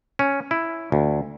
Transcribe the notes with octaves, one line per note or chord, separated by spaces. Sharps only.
C#4
E4
D2